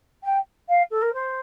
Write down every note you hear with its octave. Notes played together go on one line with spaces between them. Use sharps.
G5
F5
A4
A#4
C5